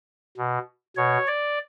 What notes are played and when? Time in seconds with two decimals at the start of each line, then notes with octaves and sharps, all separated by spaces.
0.38 B2
0.97 B2 C#5
1.27 D5